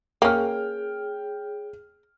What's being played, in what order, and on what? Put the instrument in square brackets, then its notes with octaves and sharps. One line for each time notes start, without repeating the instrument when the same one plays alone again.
[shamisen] A#3 C#4 [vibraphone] G#4 C#5 [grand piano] G5 F6